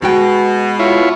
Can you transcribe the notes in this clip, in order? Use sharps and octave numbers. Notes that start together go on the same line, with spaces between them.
B2 G#3 F#4 G5
E4 F4 C#5